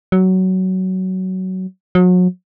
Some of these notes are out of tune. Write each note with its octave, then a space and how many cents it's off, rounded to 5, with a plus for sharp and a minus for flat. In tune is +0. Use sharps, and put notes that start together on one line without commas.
F#3 +15
F#3 -35